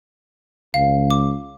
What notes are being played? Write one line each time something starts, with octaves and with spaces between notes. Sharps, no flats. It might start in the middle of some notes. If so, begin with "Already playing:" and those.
C#2 F5
D6